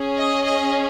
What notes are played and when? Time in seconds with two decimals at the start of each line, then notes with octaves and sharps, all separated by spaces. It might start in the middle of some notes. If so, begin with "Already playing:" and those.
Already playing: C#4 G#4
0.17 D#5
0.46 D#5